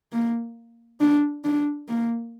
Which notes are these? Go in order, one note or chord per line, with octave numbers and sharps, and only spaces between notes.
A#3
D4
D4
A#3